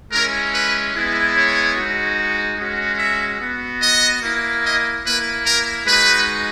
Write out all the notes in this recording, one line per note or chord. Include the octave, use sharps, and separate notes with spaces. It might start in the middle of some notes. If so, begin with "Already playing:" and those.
G#3 C#4 E4 A#4
B4
G#3 B3 E4
C#5
G#3 D#4 F#4
G#3 C#4 F#4
E5
B3 F#4
D#5
A#3 E4
D#5
A#3 E4 B4
A#4
G#3 D#4 F#4 B4